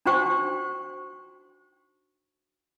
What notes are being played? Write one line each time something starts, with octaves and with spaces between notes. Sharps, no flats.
D4 D#4 F#4 C5 G5 C#6